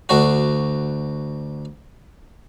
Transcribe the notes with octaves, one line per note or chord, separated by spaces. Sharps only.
D2 D4 F#4